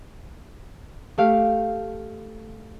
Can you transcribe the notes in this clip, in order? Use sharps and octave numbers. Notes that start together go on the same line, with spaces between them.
A3 G4 F5 F6